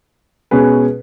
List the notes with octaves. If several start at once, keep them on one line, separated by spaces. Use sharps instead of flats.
B2 G#3 C#4 G#4 B4